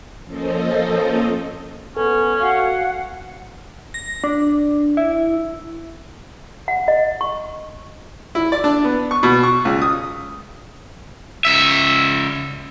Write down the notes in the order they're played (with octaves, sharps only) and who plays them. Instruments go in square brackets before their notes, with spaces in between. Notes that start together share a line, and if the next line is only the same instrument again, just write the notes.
[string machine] F3 A#3 C#4 A4 C5 D#5
[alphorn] B3 [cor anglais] C#4 [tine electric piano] A4
[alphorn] F#4 [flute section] F5 F#5
[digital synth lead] A#6
D4
E4
[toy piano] F#5
D#5
C#6
[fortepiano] E4
D5
D4
B3
C#6
B2
C#6
C#2
D#6
[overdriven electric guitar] C#2 E5